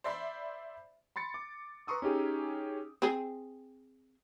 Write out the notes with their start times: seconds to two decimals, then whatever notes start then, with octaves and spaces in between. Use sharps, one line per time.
0.04 C5 D5 E5 B5 C6
1.16 B5 C6 A6 C#7
1.34 D6
1.87 B4 A#5 C6 C#6 D#6 E6
2.02 C#4 D#4 G4 G#4
3.02 C4 G#4